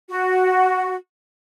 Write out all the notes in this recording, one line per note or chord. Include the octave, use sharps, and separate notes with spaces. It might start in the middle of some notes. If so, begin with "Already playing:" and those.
F#4